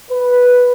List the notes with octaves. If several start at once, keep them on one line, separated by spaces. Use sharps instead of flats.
B4